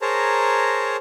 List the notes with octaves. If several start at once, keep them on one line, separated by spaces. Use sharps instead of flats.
G#4 A#4 C5 C#5 A5 A#5